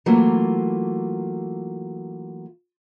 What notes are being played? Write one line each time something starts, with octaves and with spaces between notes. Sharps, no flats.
E3 F#3 A3 A#3 F4